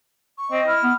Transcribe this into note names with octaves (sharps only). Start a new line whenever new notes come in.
C#6
C4 D#5
E4 F6
B3